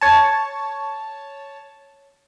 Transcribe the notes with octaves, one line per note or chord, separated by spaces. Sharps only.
C#5 A5